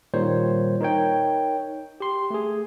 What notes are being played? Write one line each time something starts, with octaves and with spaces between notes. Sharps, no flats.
A#2 D#3 G3 C5 C#5
D#4 A#4 C#5 G5
G4 C6
A3 G#4